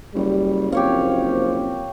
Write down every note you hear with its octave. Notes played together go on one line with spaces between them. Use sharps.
F#1 G3
F3 A#3 C4 G4 C#5 F5